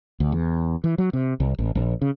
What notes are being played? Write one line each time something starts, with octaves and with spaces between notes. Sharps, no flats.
D2
E2
E3
F#3
C3
C2
A1
A#1
C#3